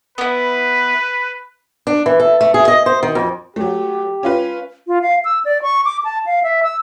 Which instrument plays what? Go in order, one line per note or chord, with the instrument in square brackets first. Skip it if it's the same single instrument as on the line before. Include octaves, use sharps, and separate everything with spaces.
[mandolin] B3 E4 [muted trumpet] B4
[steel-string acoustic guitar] D4
E3
A4
A3
G#4
D#5
C5
D#3
F2
[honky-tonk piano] F#3 A3 [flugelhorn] G4
[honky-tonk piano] C#4 F4 B4
[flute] F4
F5
E6
D5
C#6
D6
A5
F5
E5
E6